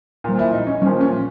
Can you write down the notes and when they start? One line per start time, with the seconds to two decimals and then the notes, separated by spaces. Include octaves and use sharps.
0.24 A#2 F3
0.39 E4
0.53 D#4
0.67 C#4
0.82 F3 C#4
0.86 A#2
1.01 C#4